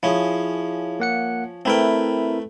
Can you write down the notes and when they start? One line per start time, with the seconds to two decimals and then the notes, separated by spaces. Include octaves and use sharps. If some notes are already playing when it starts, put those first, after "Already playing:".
0.03 F3 C#4 E4 G#4
1.00 A#3 F#5 C#7
1.65 A3 C4 E4 A#4 B4 G5